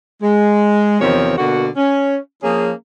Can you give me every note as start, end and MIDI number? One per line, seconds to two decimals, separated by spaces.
0.22 0.99 56
1.00 1.36 40
1.00 1.36 48
1.00 1.36 51
1.00 1.36 53
1.00 1.36 60
1.00 1.36 73
1.38 1.68 47
1.38 1.68 50
1.38 1.68 58
1.38 1.68 66
1.76 2.17 61
2.43 2.72 53
2.43 2.72 58
2.43 2.72 61
2.43 2.72 68